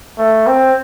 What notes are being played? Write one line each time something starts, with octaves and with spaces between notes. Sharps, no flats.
A3
C4